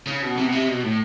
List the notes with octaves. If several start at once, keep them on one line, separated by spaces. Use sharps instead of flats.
C#3
B2
C3
B2
C3
B2
A2